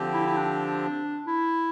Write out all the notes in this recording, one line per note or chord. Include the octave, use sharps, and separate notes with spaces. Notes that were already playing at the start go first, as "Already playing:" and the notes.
Already playing: D3 F3 C4 G4
E4
E4
D4
E4